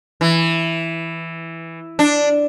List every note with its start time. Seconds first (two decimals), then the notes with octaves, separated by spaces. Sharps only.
0.21 E3
1.99 D4